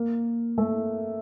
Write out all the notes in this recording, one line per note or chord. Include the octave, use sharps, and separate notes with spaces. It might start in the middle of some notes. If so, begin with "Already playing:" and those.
Already playing: A#3
A3